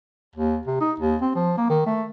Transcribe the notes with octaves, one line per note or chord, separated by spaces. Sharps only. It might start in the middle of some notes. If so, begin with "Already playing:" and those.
D#2
C3
D#4
D#2
C4
F3
A#3
D#3
A3